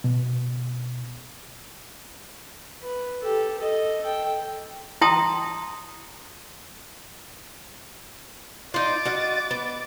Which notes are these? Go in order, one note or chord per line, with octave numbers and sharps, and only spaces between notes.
B2
B4
G4 A4
A4 D#5
A4 G5
E4 G5 A5 A#5 C6 D#6
D#4 F4 D6 A6
F#4 D#5 F5
B3